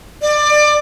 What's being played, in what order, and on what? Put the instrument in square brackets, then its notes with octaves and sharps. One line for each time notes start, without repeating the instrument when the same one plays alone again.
[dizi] D5